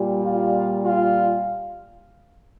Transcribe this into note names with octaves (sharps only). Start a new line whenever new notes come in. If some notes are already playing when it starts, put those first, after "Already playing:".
Already playing: A#2 G3
F4
F4